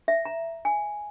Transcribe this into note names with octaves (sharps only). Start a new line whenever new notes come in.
E5
A#5
G#5